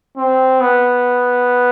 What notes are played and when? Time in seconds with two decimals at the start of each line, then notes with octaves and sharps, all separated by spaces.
0.17 C4
0.61 B3